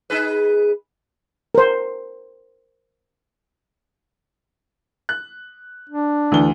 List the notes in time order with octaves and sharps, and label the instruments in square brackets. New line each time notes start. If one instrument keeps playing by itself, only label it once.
[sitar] D#4 G#4 B4
[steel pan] A#4 C5
[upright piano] F#6
[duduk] D4
[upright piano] D2 G7 [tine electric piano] D3 E3